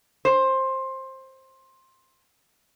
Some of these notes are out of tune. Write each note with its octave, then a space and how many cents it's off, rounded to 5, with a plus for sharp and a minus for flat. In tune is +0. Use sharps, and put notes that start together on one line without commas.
C5 +15